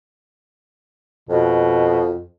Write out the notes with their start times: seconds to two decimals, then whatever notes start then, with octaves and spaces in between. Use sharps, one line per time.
1.29 F2 B2